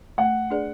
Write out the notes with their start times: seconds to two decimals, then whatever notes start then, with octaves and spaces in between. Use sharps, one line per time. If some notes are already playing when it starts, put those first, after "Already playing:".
0.18 A3 F#5
0.50 D4 G#4 B4 D5